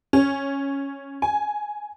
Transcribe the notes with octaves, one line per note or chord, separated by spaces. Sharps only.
C#4
G#5